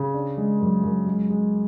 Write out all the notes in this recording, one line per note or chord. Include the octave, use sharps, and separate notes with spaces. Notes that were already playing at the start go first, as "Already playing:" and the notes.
Already playing: C#3
D4
G#3
F#2
F#2
G#3
G#3